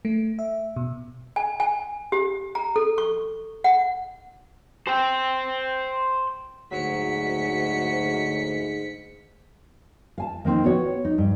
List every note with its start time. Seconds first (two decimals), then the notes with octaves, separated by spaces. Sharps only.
0.05 A3
0.39 E5
0.76 B2
1.36 G#5
1.60 G#5
2.12 G4
2.55 A#5
2.76 A4
2.98 C#6
3.64 F#5
4.88 C5 G5
6.72 D2 G#2 F#3 B6 C#7
10.18 F5 G#5 A5
10.45 D#3 A#3 C4 D#4
10.64 B3 F#4 C#5
11.05 D#4
11.18 G2